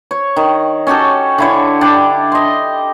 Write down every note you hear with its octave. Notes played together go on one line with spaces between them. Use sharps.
C#5
D#3
C#4 F#4 G4 A4
D3 E4 C#5
D4 G4 D5
D#5 C6